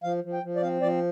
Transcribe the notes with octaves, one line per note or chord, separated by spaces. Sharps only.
F3 F5
F3
G5
F3
D5
C4 F5
F3 D5